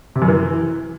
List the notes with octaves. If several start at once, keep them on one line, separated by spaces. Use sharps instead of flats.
C3
F#2
E3